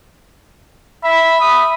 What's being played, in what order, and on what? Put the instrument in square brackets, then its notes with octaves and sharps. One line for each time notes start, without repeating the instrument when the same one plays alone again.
[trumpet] E5 [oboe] B5
[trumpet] D#6